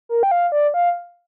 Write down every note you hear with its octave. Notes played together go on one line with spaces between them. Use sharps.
A#4
G5
F5
D5
F5